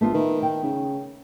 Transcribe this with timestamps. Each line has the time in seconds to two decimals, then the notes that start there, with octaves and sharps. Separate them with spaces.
0.01 A#1 A3 B3 F4
0.14 D#3 B4
0.43 G5
0.63 C#3